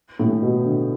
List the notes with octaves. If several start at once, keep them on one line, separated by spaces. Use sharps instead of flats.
A2
B2
D3